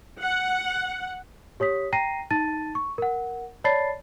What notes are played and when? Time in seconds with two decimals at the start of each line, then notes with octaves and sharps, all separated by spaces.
0.21 F#5
1.60 G4 C#5 D#6 B6
1.93 G5 A#5 A#6 C7 D#7
2.31 D#4 A5 A6 D#7
2.75 C#6
2.98 A#4 F#5
3.64 C#5 D5 A5 B5 A6 C7